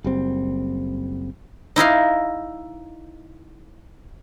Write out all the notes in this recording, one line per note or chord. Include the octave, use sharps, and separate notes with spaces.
F#1 G3 C4
D#4 E4 D#5 F5